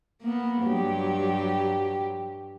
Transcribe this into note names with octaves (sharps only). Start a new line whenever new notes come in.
A#3 B3
G2 F#3 G4